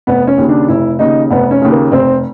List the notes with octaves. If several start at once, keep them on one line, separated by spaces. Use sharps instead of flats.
F1 B3
C#4
D#2 C#3
D4
F1 E4
D#2 C#3 D#4
F1 B3
C#4
D#2 C#3
A#3
F1 C4